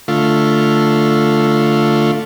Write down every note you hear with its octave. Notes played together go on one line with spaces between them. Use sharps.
D3 A3 F4